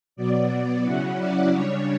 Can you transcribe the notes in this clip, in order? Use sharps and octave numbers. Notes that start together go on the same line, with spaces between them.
B2 F#3 B3 D5
D5
C#3 F#3 C#4 E4 F#5
D5
C#3 G3 D4 C#5